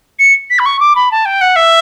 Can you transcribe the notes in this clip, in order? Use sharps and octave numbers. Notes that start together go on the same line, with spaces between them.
C#7
B6
B5
C#6
D6
B5
A5
G5
F#5
E5